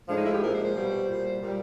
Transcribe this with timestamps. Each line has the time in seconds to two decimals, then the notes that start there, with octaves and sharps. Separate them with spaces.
0.08 A2 F3 G#3 D4
0.16 D#4
0.24 E4
0.33 G4
0.41 A#2 F3 G#3 A#4
0.53 C5
0.64 C5
0.75 B2 G3
1.08 A#2 G3
1.42 A#2 G3